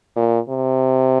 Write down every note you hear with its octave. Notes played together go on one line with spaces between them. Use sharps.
A#2
C3